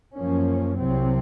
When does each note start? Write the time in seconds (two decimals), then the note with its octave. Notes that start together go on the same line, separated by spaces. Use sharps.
0.16 F#2 F3 A#3 C#4
0.78 C2 C3 F#3 C4